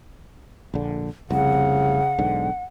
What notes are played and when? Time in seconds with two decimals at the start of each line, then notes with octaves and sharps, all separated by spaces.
0.74 A#1 D3
1.30 F1 C2 C#3 F#5
2.18 B1 G#2 D3